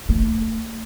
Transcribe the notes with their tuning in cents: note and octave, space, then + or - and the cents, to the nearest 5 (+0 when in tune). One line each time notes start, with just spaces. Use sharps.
A3 +25